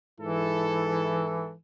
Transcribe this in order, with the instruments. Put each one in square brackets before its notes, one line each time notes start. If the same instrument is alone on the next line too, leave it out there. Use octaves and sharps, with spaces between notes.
[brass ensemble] G#2 E4 A4 [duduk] E3